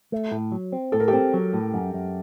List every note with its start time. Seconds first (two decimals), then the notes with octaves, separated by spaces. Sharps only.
0.12 A3
0.32 A2
0.52 F#3
0.72 C4
0.92 A2 A4
1.00 A#4
1.08 G4 A4
1.13 C4
1.34 F#3
1.53 A2
1.74 F#2
1.94 F#2